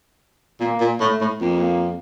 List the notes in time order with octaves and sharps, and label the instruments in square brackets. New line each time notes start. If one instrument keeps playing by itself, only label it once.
[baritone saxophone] A#2 [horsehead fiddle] A#3
[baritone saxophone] A#2
[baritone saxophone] A2 [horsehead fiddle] A3
[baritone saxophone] A2
[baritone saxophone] F2 [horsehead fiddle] A#3